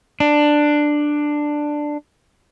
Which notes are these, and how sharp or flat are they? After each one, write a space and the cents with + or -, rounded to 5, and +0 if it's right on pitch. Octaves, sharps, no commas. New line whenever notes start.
D4 +10